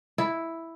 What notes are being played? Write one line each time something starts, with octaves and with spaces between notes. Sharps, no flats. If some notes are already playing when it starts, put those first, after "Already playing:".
E4